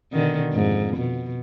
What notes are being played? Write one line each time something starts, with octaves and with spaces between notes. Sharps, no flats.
B2 D3 D#3
F2 G#2
B2